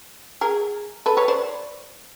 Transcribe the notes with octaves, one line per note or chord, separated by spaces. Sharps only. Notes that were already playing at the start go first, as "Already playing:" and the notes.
G#4 A#4
A4 B4
B4 C#5
C5 D5